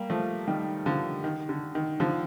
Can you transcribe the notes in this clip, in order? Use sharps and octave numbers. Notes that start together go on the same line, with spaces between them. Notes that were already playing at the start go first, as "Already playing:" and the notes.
Already playing: G3 A#3
F3 A3
D#3 G3
D3 F3
D#3
D3
D#3
D3 F3